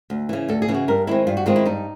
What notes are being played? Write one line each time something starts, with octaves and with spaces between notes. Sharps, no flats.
D2
C#3 E3
D2 A4
G#4
C#3 E3
F#4
G2 A#4
D#3 G#3 C4 E4
G2 F4
F#4
D#3 G#3 C4 F4
E4
G2 D#4